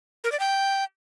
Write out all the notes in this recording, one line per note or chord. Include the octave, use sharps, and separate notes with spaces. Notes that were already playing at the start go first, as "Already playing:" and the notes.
A#4
D5
G5